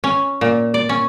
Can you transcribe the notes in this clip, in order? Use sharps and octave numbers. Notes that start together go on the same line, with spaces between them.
C#4
A#2
D5
C#4